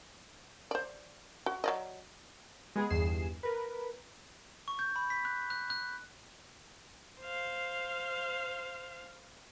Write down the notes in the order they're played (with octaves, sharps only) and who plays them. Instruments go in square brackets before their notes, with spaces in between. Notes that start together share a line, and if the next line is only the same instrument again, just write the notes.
[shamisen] C5 D5
F#4
F#3 D5 D#5
[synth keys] G#3 B3 G#4
G1 E2 G2 G#4 C7 E7
A#4 B4
[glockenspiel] C#6
G6
B5
B6
F#6
F#6
F#6
[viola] C5 F5